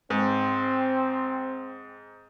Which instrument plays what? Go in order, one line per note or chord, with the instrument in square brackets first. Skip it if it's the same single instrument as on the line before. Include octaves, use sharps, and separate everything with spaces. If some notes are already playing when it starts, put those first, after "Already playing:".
[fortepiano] G#2 [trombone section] C4